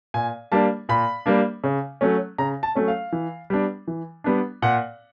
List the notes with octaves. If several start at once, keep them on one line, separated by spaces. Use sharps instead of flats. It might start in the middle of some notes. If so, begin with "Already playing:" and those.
A#2 G#5
G3 A#3 D4 A5
A#2 B5
G3 A#3 D4
C#3
F#3 A3 C#4
C#3 A#5
A5
F#3 A3 C#4
F5
E3
G3 B3 D4
E3
G3 B3 D4
A#2 F#5